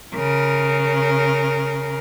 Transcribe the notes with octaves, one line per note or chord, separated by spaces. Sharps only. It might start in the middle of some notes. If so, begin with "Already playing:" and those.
C#3 A#4